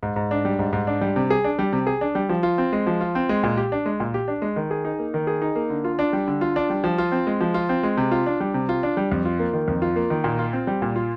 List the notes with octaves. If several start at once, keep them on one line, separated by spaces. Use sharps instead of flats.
G#2
G#2
D4
G3
G#2
G#2
D4
G3
C3
G#4
D4
G3
C3
G#4
D4
G3
F3
F4
C4
G#3
F3
F4
C4
G#3
A#2
G4
D4
G#3
A#2
G4
D4
G#3
D#3
G#4
D#4
A#3
D#3
G#4
D#4
A#3
D3
F4
D4
G3
D3
F4
D4
G3
F3
F4
C4
G#3
F3
F4
C4
G#3
C3
F4
D4
G3
C3
F4
D4
G3
F2
F4
A#3
D#3
F2
F4
A#3
D#3
A#2
F4
C4
G3
A#2
F4